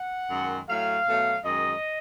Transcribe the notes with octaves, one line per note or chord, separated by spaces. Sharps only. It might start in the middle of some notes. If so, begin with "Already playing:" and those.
Already playing: F#5
F#2 D#3 G#3
A2 F#3 A3 F5
B2 F#3 A3
F#2 D#3 G#3 D#5